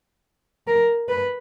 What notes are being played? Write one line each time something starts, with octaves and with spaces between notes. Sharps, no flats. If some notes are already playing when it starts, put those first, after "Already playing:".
A#4
B4